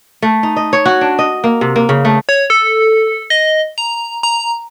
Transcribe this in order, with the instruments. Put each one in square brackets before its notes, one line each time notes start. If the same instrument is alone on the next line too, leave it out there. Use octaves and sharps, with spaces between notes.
[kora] A3
D#4
D#5
C#5
F#4
D4
D#5
A#3
C3
A#3
C#3
A3
[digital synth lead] C#5
A4
D#5
A#5
A#5